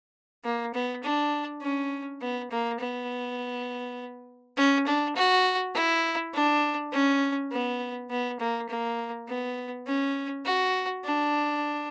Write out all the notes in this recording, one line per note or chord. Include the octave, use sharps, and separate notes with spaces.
A#3
B3
D4
C#4
B3
A#3
B3
C#4
D4
F#4
E4
D4
C#4
B3
B3
A#3
A#3
B3
C#4
F#4
D4